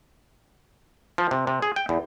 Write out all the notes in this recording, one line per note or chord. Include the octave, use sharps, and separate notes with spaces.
F3
C3
C3
G#4
G5
E2